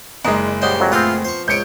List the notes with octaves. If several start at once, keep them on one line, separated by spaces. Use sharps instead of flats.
F#1 G#3 D4 D#4
G3 C#4 C5 C#5 D#5 F#5
F2 F#3
A3 B3 C4 F4 G#4
F3 C5 C#6
C#2 C#5 G6 C#7 D7